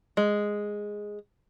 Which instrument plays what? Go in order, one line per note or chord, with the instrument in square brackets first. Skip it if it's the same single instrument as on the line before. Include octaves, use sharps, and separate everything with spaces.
[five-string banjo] G#3